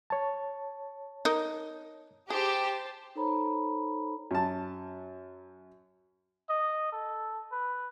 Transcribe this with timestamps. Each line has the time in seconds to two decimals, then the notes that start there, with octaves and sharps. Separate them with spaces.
0.10 C#5 A5
1.25 D#4 A#4
2.30 G4 G#4 C5 A5
3.15 D#4 A4 C5 C#5 A#5 B5
4.31 F#2 A5
6.50 D#5
6.92 A4
7.52 B4